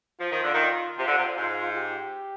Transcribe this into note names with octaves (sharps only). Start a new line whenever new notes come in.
F3 F4
D#3
D3
D#3
C3
D3
C3
G#2
G4